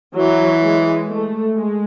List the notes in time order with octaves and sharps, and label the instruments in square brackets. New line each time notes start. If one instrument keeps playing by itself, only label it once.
[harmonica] E3 [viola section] F#3
[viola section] G#3
A3
G#3